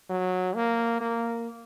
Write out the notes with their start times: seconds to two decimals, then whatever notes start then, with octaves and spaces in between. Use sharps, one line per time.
0.10 F#3
0.55 A#3
1.00 A#3